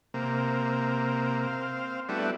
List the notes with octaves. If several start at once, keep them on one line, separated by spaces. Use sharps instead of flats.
C3 A#3
C4 F5
G3 A3 B3 D4 E4 F#4